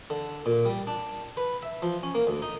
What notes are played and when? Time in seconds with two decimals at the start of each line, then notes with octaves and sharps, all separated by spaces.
0.10 D3
0.46 A#2
0.65 G3
0.87 D4
1.37 B4
1.63 E5
1.82 F3
2.03 C#4
2.15 A#3
2.27 D2
2.42 D#4